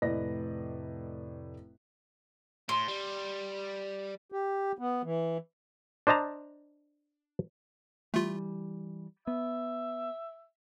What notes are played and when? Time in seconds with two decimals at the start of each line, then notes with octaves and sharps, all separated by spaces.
0.02 F1 A2 B4 D5 D#5 A#6
2.69 A2 C6
2.88 G3
4.32 G4
4.78 B3
5.04 E3
6.07 D4 C5 D#5 A5 A#5
8.14 E3 G3 A3 F4
9.27 B3 E5